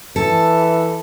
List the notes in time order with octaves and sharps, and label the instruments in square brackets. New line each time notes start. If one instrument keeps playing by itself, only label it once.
[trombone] E3 [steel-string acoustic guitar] A4